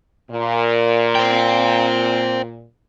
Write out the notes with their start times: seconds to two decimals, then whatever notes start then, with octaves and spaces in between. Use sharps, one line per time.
0.31 A#2
1.15 C5 G5